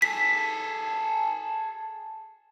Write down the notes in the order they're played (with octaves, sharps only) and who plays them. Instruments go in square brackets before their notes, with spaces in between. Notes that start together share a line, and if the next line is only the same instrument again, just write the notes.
[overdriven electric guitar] G#4 A4 [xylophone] B6